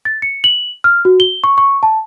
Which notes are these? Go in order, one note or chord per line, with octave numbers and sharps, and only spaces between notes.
A6
C#7
F#7
F6
F#4
G7
C#6
C#6
A5